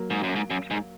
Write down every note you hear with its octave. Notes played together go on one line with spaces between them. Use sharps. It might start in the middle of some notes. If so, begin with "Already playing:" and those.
Already playing: F#3 A#3
G#2
F#2
G#2
F#2
G#2